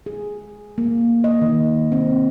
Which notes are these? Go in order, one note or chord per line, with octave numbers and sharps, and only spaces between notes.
G#4
A#3
D#5
D#3
C4